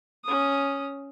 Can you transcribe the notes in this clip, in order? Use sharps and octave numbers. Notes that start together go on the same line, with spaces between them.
C#4 D#6